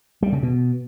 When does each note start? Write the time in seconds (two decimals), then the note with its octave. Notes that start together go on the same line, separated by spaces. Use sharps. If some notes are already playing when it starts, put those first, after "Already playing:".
0.23 G3
0.33 C#3
0.43 B2